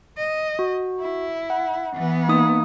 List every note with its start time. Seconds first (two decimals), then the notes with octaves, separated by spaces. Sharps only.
0.17 D#5
0.59 F#4
1.00 E4
1.50 F#5
1.93 E3 B3
2.28 A#3 D#4 D#6